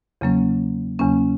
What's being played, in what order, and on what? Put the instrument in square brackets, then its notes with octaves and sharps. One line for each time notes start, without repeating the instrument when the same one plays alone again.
[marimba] E2 C#3 F#3 A#3 C#4
E2 C#3 F#3 A#3 C#4